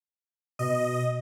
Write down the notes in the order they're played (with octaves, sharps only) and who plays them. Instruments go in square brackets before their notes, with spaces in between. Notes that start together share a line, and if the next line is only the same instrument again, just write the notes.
[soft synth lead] B2 [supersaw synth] D#5